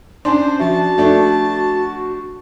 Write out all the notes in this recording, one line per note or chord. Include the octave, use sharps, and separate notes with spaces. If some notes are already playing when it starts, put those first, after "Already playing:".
C#4 D4 C5 G#5 C6
F3 F#4 E5 A5
A3 D4